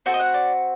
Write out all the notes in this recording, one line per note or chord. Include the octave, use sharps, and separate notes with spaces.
C4 F#4 A4 G5
D#5
F#5
D5